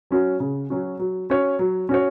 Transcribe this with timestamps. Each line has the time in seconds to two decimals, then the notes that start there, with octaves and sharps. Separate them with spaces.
0.11 F#3 C#4 F#4
0.40 C#3
0.70 F#3 C#4 F#4
0.99 F#3
1.30 C#4 F#4 C#5
1.59 F#3
1.89 C#4 F#4 C#5